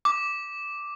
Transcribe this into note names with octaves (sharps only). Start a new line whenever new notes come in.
D6